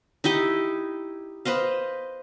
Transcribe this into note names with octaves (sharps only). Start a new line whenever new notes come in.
D#4 E4 G4 D#5
B4 C5 D#5 F5